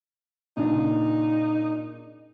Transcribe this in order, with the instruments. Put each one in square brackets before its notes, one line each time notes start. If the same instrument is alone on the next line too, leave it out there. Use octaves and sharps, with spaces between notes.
[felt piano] A#2 C#3 D4 [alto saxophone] D#4